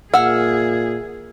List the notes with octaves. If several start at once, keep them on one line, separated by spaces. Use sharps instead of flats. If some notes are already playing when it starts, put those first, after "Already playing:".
A#2 G#4 E5 F#5 F6